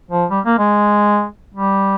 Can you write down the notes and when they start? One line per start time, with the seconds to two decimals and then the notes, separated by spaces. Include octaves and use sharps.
0.11 F3
0.31 G3
0.45 A#3
0.58 G#3
1.54 G3